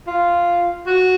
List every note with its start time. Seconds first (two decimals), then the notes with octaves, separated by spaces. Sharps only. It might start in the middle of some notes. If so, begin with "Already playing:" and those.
0.07 F4
0.87 F#4